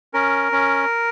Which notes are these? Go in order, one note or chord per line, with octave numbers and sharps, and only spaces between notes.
C#4 A#4
C#4